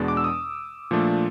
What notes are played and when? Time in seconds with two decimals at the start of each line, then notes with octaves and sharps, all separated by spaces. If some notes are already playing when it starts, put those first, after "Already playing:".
Already playing: E2 B2 G#3 B3 D4
0.08 D6
0.17 E6
0.24 D#6
0.91 A#2 F3 A3 D4